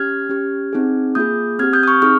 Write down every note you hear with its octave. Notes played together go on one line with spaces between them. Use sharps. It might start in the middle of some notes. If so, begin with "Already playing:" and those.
Already playing: C#4 G4 F6 G#6
C#4 G4
C4 D#4 G#4
A#3 F4 G#4 D#6 G6
C4 G4 F6 G#6
D#6 G6
D#6
C#6 F6
C4 D#4 G#4 C#6 F6